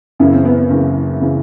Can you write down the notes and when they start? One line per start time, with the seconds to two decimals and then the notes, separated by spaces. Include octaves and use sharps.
0.20 F#1 F#2 C#3 E3 E4
0.33 C4
0.45 B3
0.58 B3
0.70 F#1 F#2 C#3 E3
1.21 C#3 E3